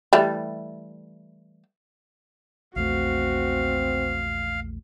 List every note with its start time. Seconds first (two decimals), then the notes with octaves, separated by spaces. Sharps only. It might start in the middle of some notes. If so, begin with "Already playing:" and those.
0.13 E3 G3 A3
2.76 A#1 E2 A3 C4 F#4 F5